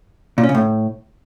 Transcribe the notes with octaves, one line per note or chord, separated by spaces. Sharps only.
A#2
C#4
C#3
A2